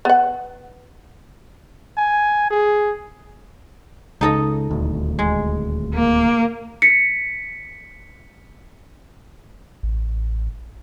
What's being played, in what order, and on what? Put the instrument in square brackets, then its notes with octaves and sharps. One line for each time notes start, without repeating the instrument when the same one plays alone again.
[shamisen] B3 F#5
[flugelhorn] G#5
G#4
[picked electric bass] C#2 [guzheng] D#4 A4 D#5
[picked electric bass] D#1 D2
[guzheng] G#3
[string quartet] A#3
[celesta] B6 C#7
[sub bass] A1